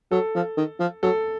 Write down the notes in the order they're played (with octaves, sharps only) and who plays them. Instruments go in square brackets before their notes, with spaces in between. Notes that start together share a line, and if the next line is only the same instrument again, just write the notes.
[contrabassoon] F#3 [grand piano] A4
[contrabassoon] F3
D#3
F3
[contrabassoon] F#3 [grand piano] A4